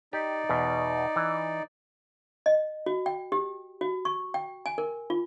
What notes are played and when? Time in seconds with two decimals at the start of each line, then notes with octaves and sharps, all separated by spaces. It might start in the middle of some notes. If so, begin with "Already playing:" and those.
0.13 D#4 G4 D5
0.49 E2 B2
1.16 E3
2.46 D#5
2.86 F#4
3.06 G5
3.32 G4
3.81 F#4
4.05 C#6
4.34 G5
4.66 G#5
4.78 A#4
5.10 F4